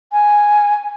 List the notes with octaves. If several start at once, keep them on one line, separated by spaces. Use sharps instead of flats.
G#5